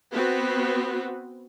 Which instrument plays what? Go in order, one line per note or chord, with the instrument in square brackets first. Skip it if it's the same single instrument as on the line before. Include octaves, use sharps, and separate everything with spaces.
[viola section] B3 C4 F#4 B4